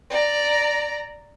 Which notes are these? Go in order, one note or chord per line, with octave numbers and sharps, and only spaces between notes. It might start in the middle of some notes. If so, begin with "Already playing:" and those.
D5 A#5